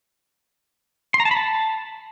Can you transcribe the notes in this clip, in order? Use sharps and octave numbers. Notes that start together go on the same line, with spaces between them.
C6
A#5
A5
B5
A5